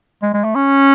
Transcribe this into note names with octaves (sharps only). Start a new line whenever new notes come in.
G#3
G#3
A3
C#4